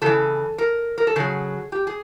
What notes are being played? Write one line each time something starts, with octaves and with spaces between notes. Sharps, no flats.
C#3 E3 A4
A#4
A#4
A4
C#3 F#3 G#4
G4
G#4